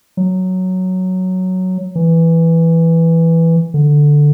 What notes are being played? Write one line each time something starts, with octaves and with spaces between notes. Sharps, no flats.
F#3
E3
D3